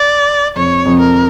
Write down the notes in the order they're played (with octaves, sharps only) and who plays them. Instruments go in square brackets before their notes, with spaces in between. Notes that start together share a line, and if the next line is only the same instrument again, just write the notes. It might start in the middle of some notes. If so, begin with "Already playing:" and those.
Already playing: [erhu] D5
[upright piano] F2 [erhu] C#5
[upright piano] F2
[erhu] A#4